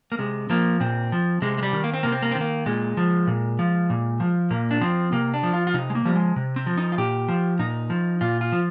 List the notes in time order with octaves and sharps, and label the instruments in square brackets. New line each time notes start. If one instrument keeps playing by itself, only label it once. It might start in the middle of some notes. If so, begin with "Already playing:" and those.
[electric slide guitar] A#3
C3 G#3
F3 A#3
A#2 C4
F3
C3 G#3
G#3
G3
D#3
A#3
C4
C3 A#3
C4
A#3
D#3 C4
A#3
A#2 G#3
F3
A#2
F3
A#2
F3
A#2 A#3
D4
F3 C4
C3 A#3
D4
F3
F4
F4
C3 D#4
G#3
A#3
F3 G3
G#3
C3
C4
F3
D#4
F4
A#2 G4
F3
A#2 D#4
F3
A#2 F4
F4
F3